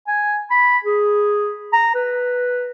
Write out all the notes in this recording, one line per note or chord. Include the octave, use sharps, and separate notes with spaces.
G#5
B5
G#4
A#5
B4